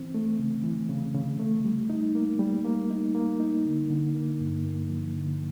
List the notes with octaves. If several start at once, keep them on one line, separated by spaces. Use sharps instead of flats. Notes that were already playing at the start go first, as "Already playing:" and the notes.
Already playing: E3 C4
A3
C#3
E3
C#3
C#3
A3
G3
D#4
A#3
G3
A#3
D#4
A#3
D#4
D3
D3
A#3
G2
A#3
F3
D3